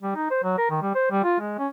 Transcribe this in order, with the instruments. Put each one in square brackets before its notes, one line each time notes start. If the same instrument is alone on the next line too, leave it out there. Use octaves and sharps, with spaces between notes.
[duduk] G3
D#4
C5
F#3
A#4
D#3
G3
C5
G3
F4
G#3
C#4